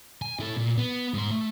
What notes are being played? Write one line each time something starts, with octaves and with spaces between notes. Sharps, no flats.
G#5
E4 A4
A#2
B3
G#2 C6
A3